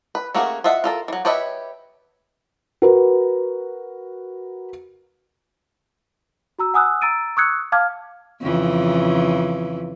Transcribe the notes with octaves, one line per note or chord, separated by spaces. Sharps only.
B4
A3 A#3 C#4 F#4 G#4
F4 D#5 E5 F#5
F4 A4 A#4
E3 F#3
G4 B4 C#5 D#5 E5
F#4 A#4 B4
F#4 A#5 E6
F#5 G#5 D#6 E6 F#6
A#5 E6 A6 D7 D#7
C#6 D#6 E6 F#6 G#6 C#7
F5 A5 D6 F6 G#6
F2 C#3 E3